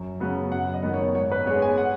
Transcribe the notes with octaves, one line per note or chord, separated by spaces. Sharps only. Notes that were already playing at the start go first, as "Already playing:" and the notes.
Already playing: F#2
C#3 F#3 B3
F#2 F#5
D#5
D#3 B3
C#5
G#2 C#5
B4
G#3 B3 C#5
G#5
F#5